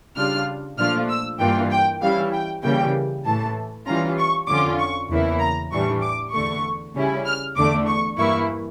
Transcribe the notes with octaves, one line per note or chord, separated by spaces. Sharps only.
C#3 G3 D4 F4 F6
A#2 F3 A3 D4 F4 F6
E6
G2 E3 A#3 D4 F4 G5
G5
E3 G3 C#4 E4 F5
G5
C#3 E3 G3 A#3 G5
A2 E3 A3 A5
E3 G3 C#4 F4 A#5
C#6
F2 D3 F3 C#4 F4 D6
C#6
E2 C#3 E3 A#3 E4
A#5
A2 E3 G3 D4 C#6
D6
E2 D3 A3 C#6
C#3 G3 C#4 E4
F6
E2 D3 A3 D4 D6
C#6
G2 E3 A#3 E4 C#6